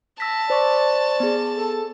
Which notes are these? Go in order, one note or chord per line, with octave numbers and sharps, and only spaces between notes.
A5 E6 A#6 B6
C5 D5 C#6
B3 G#4
A4